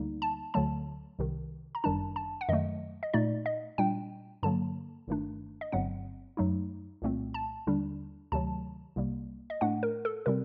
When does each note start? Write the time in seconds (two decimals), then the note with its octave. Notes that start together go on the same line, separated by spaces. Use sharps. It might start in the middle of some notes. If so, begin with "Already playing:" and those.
Already playing: D2 D3 G3 A#3 D#4
0.22 A5
0.54 D2 D3 F#3 A3 A5
1.19 C2 C3 D#3
1.75 A#5
1.84 G1 F#2 D#3 G3 D4 A5
2.16 A5
2.41 F#5
2.49 F#2 D#3 F#3 A3 D#5
3.03 D#5
3.13 A#2 A3 D#4 D5
3.46 D#5
3.78 A#2 G3 D4 G5
4.43 G2 D3 F#3 A#3 A5
5.08 G1 G2 D#3 A3 D4
5.61 D#5
5.72 G1 G2 F#3 C4 F#5
6.37 F#2 F#3 A3 D#4
7.02 C2 A#2 A3 C4
7.34 A5
7.67 D#2 D3 G3 D4
8.32 D2 C3 D#3 F#3 A3 A5
8.96 C2 C3 G3 A#3
9.50 D#5
9.61 A2 A3 D4 F#5
9.83 A#4
10.05 A4
10.26 C3 G3 C4 A#4